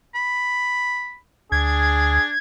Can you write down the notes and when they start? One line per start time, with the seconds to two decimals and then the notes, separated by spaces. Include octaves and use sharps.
0.15 B5
1.52 D2 D4 G#4 G#6